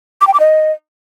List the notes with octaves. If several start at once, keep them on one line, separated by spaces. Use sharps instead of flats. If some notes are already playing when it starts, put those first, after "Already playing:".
D6
G5
D6
D#5